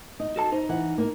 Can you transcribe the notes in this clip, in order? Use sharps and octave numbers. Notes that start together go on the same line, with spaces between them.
D#4
F#4 A4 A5
D#4 C5
E3 F#5
A#3 A#4